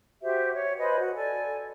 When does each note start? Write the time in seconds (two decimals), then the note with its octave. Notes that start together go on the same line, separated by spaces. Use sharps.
0.22 F#4 G4 C5 E5
0.54 C#5
0.78 B4 C5 D#5 G#5
0.99 F#4
1.16 A4 D5 G#5